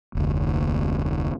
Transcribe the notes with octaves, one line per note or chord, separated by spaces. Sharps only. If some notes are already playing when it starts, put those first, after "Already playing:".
F1 D2